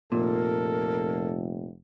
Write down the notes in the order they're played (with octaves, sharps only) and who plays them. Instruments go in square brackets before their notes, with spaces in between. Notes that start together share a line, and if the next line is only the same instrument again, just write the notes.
[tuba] F1 [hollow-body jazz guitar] A#2 [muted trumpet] A4 [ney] A#4